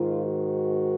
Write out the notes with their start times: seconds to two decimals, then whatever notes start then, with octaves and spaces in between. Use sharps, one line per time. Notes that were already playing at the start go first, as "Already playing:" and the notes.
Already playing: G#2 D#3 F4
0.23 F#4